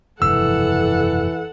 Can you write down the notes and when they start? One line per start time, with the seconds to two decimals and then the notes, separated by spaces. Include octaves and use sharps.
0.22 F1 G2 B2 E3 A4 F#5 E6